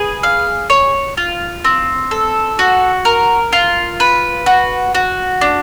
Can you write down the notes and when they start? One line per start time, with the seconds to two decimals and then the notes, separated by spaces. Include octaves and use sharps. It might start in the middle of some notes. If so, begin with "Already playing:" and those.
Already playing: G#4 B4
0.23 F5
0.70 C#5
1.17 F4
1.65 C4
2.11 A4
2.59 F#4
3.05 A#4
3.53 F4
4.00 B4
4.46 F#4
4.95 F#4
5.41 D4